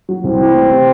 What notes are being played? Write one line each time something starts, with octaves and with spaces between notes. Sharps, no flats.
F#3
C2 C4
E3
A3
C3